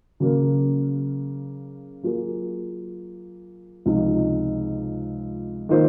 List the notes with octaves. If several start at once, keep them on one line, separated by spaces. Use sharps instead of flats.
C#3 F#3 A#3
F#3 A#3 F4 G#4
C#2 C3 F3 G#3 D#4
D#3 A#3 F4 C5